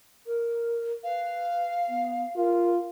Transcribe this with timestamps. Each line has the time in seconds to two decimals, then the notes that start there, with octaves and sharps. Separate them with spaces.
0.26 A#4
1.04 B4 F5
1.88 B3
2.36 F4 A#4